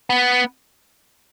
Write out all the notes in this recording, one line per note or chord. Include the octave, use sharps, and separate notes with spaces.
B3